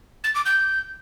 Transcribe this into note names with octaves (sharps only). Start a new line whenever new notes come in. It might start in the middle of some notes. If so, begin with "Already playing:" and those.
A6
D6
G6